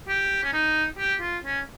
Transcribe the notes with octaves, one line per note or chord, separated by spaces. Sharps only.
G4
C#4
D#4
G4
F4
C#4